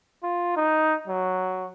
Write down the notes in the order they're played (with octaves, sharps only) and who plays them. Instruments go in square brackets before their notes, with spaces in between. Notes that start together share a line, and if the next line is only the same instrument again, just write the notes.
[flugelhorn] F4
D#4
F#3